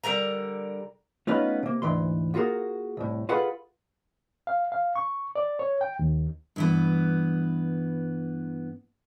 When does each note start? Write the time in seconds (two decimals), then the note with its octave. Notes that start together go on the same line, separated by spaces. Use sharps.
0.04 D3 G3 A#4 A#5
1.27 A3 B3 C#4 D#4 F4 B4
1.63 C3 A#3
1.82 D2 G#2 E3 C6
2.34 A#3 F4 F#4 G#4 A#4
2.97 C2 A2
3.29 F4 G#4 A4 B4 F5 F#5
4.47 F5
4.72 F5
4.96 C#6
5.36 D5
5.59 C#5
5.81 G5
5.99 D#2
6.56 G2 E3 B3